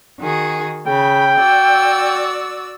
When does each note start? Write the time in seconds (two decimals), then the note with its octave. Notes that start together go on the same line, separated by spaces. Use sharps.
0.19 D#3 F#4 G#4
0.87 C#3 G5 B5
1.38 F#4 D5 E6